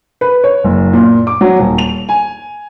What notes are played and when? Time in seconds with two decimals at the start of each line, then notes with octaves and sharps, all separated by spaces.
0.21 B4
0.44 C#5
0.64 F#1
0.93 A#2
1.27 D6
1.41 F#3
1.59 D#1
1.78 F7
2.09 G#5